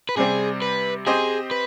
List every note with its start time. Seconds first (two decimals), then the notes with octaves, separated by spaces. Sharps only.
0.09 B4
0.17 C3 G3 C4 G4 G#4
0.62 B4
1.07 C4 G4 G#4 C5 D#5
1.51 B4